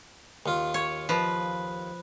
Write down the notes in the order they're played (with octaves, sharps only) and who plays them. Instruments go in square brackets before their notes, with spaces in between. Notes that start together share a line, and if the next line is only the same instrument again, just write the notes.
[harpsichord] D#2 F4
[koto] C#5
[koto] F3 [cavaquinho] B4 D#5